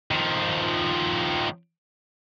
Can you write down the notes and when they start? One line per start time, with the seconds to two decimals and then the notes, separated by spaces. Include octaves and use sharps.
0.11 D#3 F3